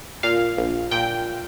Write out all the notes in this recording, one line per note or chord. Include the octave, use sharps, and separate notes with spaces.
A#2 F5
A#1
A#2 G5